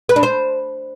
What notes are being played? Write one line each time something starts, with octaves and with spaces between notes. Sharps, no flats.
B4
D4
C5